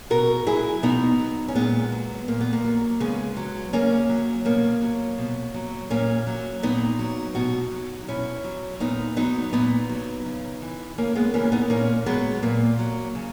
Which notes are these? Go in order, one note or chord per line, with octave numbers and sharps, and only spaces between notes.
B2 F#4 A#4
F#3 E4 G#4
B2 B3 D#4
F#3
C#4
A#2 G#3 B3
F#3
A#2 A#3
B3
A#3
F#3
C#3 G#3 B3
F#3
C#3 A#3 C#4
F#3
B2 A#3 C#4
F#3
B2
F#3
A#2 A#3 C#4
F#3
A#2 B3 D#4
F#3
B2 D#4 F#4
F#3
B2 C#4 E4
F#3
A#2 B3 D#4
F#3 B3 D#4
A#2 B3 D#4
F#3
C#3
E3
C#3 A#3 C#4
G#3 B3
E3 A#3 C#4
B3 D#4
A#2 A#3 C#4
F#3 G#3 B3
A#2 A#3
F#3
C#3